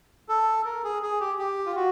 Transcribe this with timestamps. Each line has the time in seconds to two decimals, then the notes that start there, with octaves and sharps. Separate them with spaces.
0.29 A4
0.65 A#4
0.84 G#4
1.03 G#4
1.20 G4
1.39 G4
1.66 F4
1.76 F#4